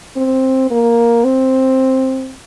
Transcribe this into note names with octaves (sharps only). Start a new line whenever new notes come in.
C4
A#3
C4